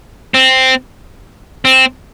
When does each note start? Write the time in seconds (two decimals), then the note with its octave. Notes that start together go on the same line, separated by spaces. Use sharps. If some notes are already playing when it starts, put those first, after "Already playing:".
0.34 C4
1.65 C4